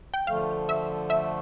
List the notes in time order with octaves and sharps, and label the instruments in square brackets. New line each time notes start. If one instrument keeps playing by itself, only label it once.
[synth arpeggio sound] G5
[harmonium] D3 F3 A3 [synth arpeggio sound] F5
[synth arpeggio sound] E5
E5